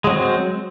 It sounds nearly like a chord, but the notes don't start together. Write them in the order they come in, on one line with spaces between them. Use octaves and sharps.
G#3 F#3 C4